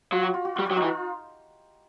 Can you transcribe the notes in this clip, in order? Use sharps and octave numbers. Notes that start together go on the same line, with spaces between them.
F#3 F4
F#4
F4
F#4
G3 F4
F#4
F#3
D#4 F4
E3